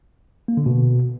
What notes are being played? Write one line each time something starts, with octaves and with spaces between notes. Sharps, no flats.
A#3
D3
B2